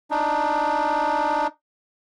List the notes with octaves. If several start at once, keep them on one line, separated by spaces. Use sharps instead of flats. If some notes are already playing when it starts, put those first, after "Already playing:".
D4 D#4